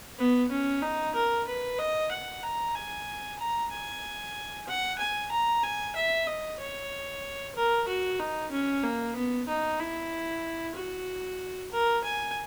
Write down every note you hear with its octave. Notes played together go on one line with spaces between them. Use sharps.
B3
C#4
D#4
A#4
B4
D#5
F#5
A#5
G#5
A#5
G#5
F#5
G#5
A#5
G#5
E5
D#5
C#5
A#4
F#4
D#4
C#4
A#3
B3
D#4
E4
F#4
A#4
G#5